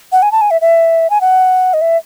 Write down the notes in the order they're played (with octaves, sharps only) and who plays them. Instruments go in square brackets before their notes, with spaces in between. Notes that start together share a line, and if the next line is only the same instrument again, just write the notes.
[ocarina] F#5
G#5
A5
G#5
E5
E5
G#5
F#5
D#5
E5